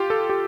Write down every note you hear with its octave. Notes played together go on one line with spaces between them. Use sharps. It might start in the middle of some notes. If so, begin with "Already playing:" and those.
Already playing: F4 G4
A4
G4